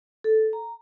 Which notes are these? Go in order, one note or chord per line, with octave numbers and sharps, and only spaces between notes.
A4
A#5